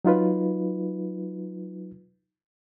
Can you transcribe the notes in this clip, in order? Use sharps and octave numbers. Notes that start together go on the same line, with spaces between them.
F#3 D#4 F4 B4